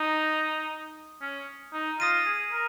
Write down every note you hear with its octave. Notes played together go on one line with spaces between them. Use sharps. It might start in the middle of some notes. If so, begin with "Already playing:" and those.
Already playing: D#4 D#6
C#4
D#4
F4 D#6 A#6 D#7
G#4
A#4